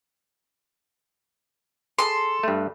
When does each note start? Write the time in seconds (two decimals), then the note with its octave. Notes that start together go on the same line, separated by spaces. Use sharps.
1.99 G#4 A4 C6
2.43 G2 A3